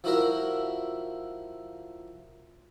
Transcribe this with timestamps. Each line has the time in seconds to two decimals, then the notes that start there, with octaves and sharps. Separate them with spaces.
0.04 F3 E4 F#4 A#4 E5